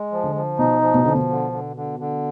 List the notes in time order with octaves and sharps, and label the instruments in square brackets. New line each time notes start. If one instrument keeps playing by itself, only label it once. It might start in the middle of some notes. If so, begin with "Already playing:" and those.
Already playing: [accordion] G#3
F3
[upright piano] D3
[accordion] F3
[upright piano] B2 [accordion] D#4
[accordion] F3
[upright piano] B2
[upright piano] D3 [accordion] F3
[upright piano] B2
[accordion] D3
D3
D3
D3